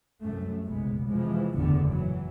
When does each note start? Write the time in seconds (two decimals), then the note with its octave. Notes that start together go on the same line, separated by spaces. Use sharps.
0.22 C2 F#2 A3
0.64 F1 B1 C#3 G#3 B3
1.07 C3 E3 F3 G#3
1.54 F#1 E2 A2 D3 B3
1.89 A#2 E3 F#3